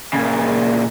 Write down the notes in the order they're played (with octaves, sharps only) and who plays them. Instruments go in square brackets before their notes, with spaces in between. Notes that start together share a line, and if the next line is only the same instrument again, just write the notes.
[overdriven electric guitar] A#2 C#3